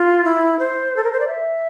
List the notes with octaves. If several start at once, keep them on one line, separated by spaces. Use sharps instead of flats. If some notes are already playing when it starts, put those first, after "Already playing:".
Already playing: F4
E4
C5
A4
A#4
C5
D5
E5